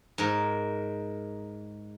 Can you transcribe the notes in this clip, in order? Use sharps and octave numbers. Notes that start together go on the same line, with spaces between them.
G#2 A#4